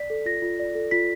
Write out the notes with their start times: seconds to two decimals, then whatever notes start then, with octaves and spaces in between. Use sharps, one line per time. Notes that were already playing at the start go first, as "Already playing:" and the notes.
Already playing: D5 B6
0.10 A4
0.26 F4 A#6
0.42 F4
0.60 D5
0.75 A4
0.91 F4 B6